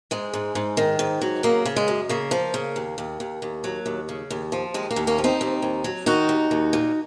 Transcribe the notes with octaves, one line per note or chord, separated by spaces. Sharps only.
G#2 G#3
G#2
G#2
D#3
G#2
F#3
C#3 A#3
C#3
G#3
F#2
C#3 A#3
F3
C#3
D#2
D#2
D#2
D#2
F#3
D#2
C#3
D#2
F3
D#2 G#3
A#3
D#2
A#3 C#4
F3
C4 D#4
D#2
D#2
F#3
D#3 D#4 F#4
D#2
D#2
A#2